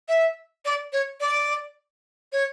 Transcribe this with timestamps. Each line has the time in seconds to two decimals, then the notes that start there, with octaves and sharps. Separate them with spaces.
0.09 E5
0.65 D5
0.93 C#5
1.20 D5
2.32 C#5